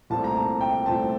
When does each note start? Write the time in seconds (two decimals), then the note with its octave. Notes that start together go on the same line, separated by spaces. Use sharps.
0.10 C2 A#2 A3 C4 A5
0.24 A#5
0.36 A5
0.61 G5
0.86 C2 A#2 A3 C4 A5